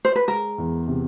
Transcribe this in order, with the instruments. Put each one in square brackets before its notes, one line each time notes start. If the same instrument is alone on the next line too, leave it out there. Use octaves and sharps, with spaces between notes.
[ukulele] C5
B4
[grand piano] G#3 [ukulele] A#4
[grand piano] E2
C3